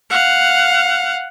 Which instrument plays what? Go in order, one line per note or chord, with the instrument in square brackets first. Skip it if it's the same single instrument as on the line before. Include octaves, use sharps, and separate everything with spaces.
[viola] F5 F#5